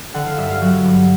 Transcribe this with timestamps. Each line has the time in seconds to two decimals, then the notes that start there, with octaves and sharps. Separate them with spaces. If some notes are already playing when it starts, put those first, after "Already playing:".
0.14 D3 F#5
0.26 F5
0.38 G2 E5
0.50 F5
0.61 F#3 F#5
0.85 G2